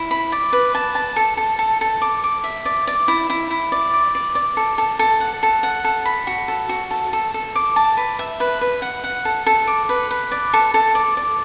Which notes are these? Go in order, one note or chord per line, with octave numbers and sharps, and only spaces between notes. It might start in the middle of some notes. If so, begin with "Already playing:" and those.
Already playing: E4
B5
D5
B4
A5
A5
A4
A4
A4
A4
D6
D6
E5
D5
D5
E4
E4
E4
D5
D6
D5
D5
A4
A4
A4
F#5
A4
F#5
A4
B5
F#4
A4
F#4
A4
A4
A4
D6
A5
B4
E5
B4
B4
F#5
F#5
A4
A4
D6
B4
B4
D5
A4
A4
D5
D5